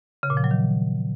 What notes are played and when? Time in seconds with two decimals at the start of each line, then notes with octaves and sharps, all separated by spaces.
0.23 C#3
0.30 A#2
0.37 F3
0.44 F#3
0.51 D#3